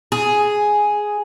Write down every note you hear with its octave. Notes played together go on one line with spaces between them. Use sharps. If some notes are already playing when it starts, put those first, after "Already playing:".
G#4